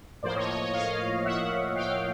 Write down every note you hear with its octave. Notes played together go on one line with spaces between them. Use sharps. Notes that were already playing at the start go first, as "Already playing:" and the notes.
A2 F3 A#3 C5 D5
C#5 D#5
C#5 D#5
C#5 D#5
D#5 F5
E5 F#5
F5 G5